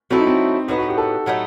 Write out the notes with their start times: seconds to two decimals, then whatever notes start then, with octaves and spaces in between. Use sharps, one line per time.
0.11 F#3 A3 C4 E4 A4
0.18 D#4
0.27 C4
0.68 A2 F#3 B3 D#4
0.78 F#4
0.88 G4
0.98 A4
1.26 A2 F#3 A3 D#4